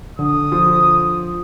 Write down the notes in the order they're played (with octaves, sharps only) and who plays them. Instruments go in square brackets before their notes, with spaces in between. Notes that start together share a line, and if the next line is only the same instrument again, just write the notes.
[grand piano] D3 [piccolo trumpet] D#6
[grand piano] F3